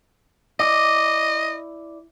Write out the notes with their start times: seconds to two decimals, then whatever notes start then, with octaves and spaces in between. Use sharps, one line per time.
0.60 E4 D5 D#5